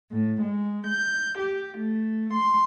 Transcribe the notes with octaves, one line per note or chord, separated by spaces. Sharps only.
A2
G#3
G6
G4
A3
C6